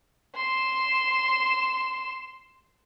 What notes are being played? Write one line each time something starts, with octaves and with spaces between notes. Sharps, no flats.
C6 E7